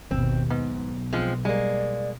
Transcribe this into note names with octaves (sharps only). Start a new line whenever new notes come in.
G1 D#2 B2 C4
B1 G#2 B3
F3 G#3 C4
G3 G#3 A#3 D5